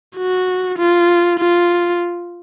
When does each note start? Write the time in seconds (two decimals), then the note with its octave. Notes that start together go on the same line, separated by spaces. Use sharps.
0.17 F#4
0.78 F4
1.39 F4